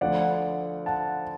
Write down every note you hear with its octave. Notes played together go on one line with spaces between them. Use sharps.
D2 D3 F3 D5 F#5
F#5 A5